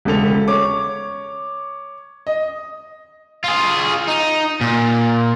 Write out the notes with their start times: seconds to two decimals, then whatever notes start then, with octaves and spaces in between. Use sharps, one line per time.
0.05 E1 C#3 A4 F7
0.48 C#5 C#6 D6
2.27 D#5
3.44 F4 G#4
4.07 D#4
4.61 A#2